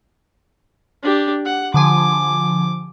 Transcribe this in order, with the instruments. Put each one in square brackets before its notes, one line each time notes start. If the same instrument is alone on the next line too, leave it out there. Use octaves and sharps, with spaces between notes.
[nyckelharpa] D4 G4
F#5
[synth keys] D3 F3 G#5 [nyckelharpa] D6